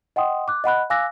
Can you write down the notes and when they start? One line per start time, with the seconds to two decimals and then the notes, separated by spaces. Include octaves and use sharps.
0.16 D#5 F#5 G5 C6 D#6
0.48 D6 F#6
0.64 D#5 F#5 B5 F#6
0.90 F5 G#5 D6 E6 F#6 A#6